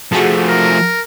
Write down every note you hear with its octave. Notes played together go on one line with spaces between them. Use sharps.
F3 A3 F#4 G#4 A4
A#4